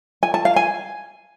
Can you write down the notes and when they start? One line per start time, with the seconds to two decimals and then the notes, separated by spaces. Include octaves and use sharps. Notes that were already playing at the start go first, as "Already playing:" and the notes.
0.23 G#5
0.34 A5
0.45 F5
0.56 G#5